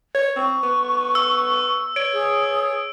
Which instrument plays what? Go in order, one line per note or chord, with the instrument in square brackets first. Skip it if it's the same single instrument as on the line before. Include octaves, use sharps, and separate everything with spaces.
[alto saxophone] C#5
[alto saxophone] C4 [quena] C#6
[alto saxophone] B3
[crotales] E6
[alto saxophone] C#5 [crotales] D7
[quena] G#4